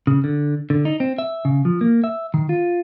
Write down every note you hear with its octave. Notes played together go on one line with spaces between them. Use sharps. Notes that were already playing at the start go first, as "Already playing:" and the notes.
C#3
D3
D3
D#4
C4
E5
C#3
F3
A#3
E5
D#3
F4